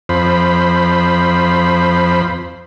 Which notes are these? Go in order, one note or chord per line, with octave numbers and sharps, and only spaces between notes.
F2 C5 B5